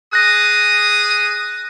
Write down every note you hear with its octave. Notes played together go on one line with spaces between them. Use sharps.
G#4 D#6 F#6 A#6